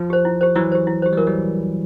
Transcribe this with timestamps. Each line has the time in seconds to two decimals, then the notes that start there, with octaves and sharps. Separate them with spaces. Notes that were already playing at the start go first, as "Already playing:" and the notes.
Already playing: F3
0.10 G4 C5
0.25 E4
0.41 G4 C5
0.55 E3 F#3 E4
0.72 G4 C5
0.87 E4
1.02 G4 C5
1.13 G3
1.17 E3 F#3 A#4
1.27 G3